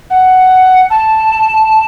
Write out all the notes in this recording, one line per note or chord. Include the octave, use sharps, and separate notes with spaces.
F#5
A5